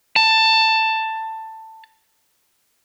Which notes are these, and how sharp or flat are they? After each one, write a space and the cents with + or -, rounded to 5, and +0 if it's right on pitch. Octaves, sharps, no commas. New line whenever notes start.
A5 +15